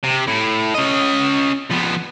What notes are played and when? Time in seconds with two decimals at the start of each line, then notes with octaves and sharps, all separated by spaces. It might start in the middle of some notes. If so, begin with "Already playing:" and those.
0.04 C3
0.27 A2
0.74 C#4 D#5
1.71 F3 B3